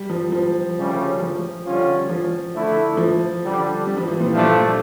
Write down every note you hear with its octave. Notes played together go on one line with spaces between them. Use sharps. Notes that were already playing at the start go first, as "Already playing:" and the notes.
Already playing: G3
F3
F3
D2 C#3 G3 C#4
F3
D3 G3 C#4 F4
F3
D3 A3 E4 A4
F3
D3 G3 D4
G3
F3
E3
A#2
G2 A#2 F3 A3 D4